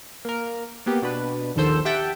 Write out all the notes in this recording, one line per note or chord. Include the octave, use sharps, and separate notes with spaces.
A#3 A#4
A#3 B3 G4
B2 D4 B4
A#1 D#2 D#3 A4 C5 E6
G4 E5 F#5 G5 A5